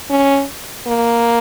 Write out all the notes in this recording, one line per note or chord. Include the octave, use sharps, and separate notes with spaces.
C#4
A#3